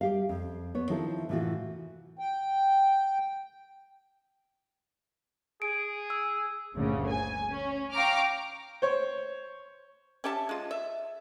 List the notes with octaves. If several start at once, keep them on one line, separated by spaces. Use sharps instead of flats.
G3 G4 F5
F2
B3 C#5
D#3 F3 C4 E4 A4
A2 C3 E3 D#4 F4 F#4
G5
G#4 D7
E6
G1 D2 A#2 C#3
G#5
C#4
F5 G5 A#5 C#6 D6 F6
C5 C#5
C#4 G4 E5 A5
G#3 F4
E5